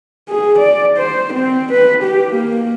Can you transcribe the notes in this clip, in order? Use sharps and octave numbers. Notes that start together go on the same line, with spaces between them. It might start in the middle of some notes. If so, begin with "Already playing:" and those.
G#4
D5
C5
C4
B4
G4
A#3